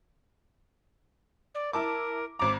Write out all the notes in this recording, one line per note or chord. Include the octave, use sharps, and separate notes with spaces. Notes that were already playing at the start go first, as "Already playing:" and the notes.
D5
E4 A#4 A5 D6
G#1 A#5 D6